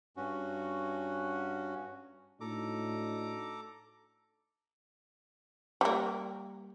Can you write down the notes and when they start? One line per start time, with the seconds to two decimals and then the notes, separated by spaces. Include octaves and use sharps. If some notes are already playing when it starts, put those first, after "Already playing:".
0.17 G2 C#4 F#4
2.41 A2 D4 D#4 F#4 A4 A#5 D6
5.81 G3 A#3